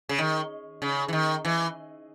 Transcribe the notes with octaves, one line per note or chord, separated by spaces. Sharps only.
C#3
D#3
C#3
E3
D#3
E3